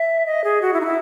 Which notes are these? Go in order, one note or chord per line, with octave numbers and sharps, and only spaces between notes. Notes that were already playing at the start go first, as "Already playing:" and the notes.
Already playing: E5
D#5
G#4
F#4
E4
D#4
E4